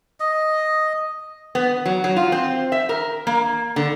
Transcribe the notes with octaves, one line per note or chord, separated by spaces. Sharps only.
D#5
B3
F#3
F#3
F4
C4
E5
A#4
A#3
D3